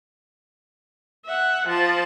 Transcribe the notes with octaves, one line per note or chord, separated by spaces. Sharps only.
E5 F#5
F3 A5